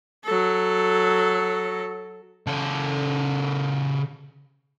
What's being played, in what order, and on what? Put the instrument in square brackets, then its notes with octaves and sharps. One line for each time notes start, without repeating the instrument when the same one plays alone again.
[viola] F#3 A4
[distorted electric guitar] C#3 A4